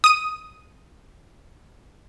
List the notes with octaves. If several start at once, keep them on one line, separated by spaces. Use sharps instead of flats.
D#6 D#7